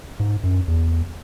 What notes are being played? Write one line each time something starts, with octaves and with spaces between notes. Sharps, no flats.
G#2
F#2
E2